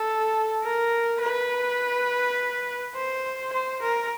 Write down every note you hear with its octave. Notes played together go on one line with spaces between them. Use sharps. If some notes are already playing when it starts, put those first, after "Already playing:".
Already playing: A4
A#4
B4
C5
C5
A#4